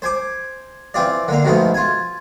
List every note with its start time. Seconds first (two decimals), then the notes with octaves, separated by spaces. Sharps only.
0.02 C5 G#5 D6
0.94 E3 C4 F4 D5
1.28 D3 A#3 F5
1.44 G#2 B2 D#3 F3 A3 B3
1.74 F4 G#5